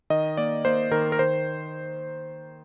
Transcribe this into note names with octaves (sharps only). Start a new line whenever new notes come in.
D#3 D#5
A#3 D5
A#3 C5
D#3 A#4
A#4
D#3 C5